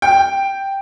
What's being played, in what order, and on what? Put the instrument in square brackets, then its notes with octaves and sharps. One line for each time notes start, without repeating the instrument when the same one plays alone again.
[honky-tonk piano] G5